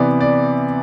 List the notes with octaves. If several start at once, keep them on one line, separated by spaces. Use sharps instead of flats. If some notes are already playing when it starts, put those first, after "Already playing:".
Already playing: C3 E3 B3 D5
D5